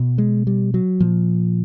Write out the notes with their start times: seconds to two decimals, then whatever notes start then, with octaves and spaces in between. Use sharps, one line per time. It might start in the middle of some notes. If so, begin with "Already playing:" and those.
Already playing: B2
0.18 G#3
0.47 G3
0.74 F#3
1.00 A#2 F3